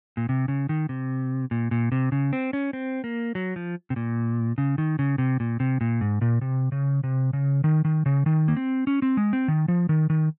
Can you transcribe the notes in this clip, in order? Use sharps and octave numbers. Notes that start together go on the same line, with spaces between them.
A#2
C3
C#3
D#3
C3
A#2
A#2
C3
C#3
C4
C#4
C4
A#3
F#3
F3
C3
A#2
C#3
D#3
C#3
C3
A#2
C3
A#2
G#2
A#2
C3
C#3
C3
C#3
D#3
D#3
C#3
D#3
A#3
C4
C#4
C4
G#3
C4
D#3
F3
D#3
D#3